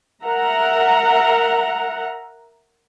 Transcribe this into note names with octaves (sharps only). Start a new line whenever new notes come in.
A#4 E5 F#5 A#5